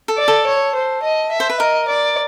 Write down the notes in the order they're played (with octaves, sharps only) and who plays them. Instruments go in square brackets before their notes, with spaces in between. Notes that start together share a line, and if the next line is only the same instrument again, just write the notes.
[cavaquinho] A4
[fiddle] D5
[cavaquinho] A4
[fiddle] C#5
C5
D#5
E5
[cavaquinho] C5
B4
[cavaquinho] A#4 [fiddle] D#5
[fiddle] D5